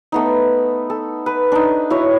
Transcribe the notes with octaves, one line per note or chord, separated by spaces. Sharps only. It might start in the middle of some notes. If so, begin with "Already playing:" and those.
A3 B3 D#4
A4
B4
D4 D#4
E4 F#4 C#5